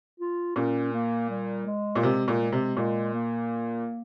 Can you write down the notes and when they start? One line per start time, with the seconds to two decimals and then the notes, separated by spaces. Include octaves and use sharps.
0.20 F4
0.56 A#2 C#4
0.93 A#3
1.30 G3
1.66 G#3
1.96 A#2
2.03 C3 G#3
2.28 A#2
2.40 G#3
2.52 C3
2.77 A#2 G#3
3.14 A#3